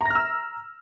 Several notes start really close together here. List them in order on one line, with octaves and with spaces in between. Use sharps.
A#5 A#6 F6 E6